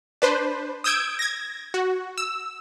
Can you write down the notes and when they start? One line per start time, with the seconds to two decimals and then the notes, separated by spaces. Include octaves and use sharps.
0.22 D4 B4 C5
0.84 D#6 E6 G6 G#6 D7
1.19 G#6 A#6
1.74 F#4
2.18 E6